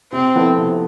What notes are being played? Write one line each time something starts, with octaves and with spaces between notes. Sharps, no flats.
C3 C4
F3 B3 E4 A4
C3